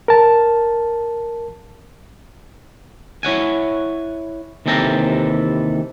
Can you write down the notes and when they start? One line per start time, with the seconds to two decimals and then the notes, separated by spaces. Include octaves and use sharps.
0.08 A#4 A5
3.23 E4 C#5 F#5 G#5
4.66 D#2 C3 E3 A4 G5 A#5